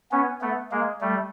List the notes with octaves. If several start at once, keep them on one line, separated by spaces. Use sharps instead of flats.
B3 C#4
A3 B3
G#3 A#3
G3 A3